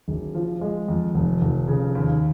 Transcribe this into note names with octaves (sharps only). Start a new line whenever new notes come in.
F#1
F3
G#3
F2
F1
F1
C#3
D#2